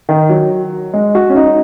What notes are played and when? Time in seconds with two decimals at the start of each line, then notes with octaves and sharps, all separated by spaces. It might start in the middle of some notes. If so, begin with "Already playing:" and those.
0.09 D#3
0.30 F#3
0.93 G#3
1.15 F#4
1.29 C#4
1.36 D#4